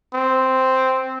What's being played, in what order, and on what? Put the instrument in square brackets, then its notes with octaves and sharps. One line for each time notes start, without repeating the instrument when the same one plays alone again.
[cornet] C4